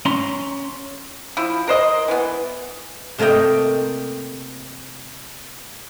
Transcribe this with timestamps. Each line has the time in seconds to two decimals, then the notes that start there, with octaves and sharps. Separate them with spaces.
0.05 C#4 A#5 C6
1.37 F3 E4
1.67 A#4 C5 D#5
2.08 E3 B3
3.18 C3 A3 A#3 D#5 G5